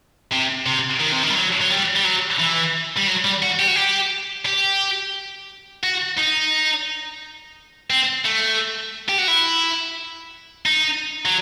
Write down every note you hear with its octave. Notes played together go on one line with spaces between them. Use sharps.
C3
C3
D#3
C3
D#3
G3
F#3
F#3
G3
G3
F#3
E3
G3
F#3
G3
F#4
G4
F#4
G4
G4
F#4
D#4
C4
A3
G4
F#4
E4
D#4
F#3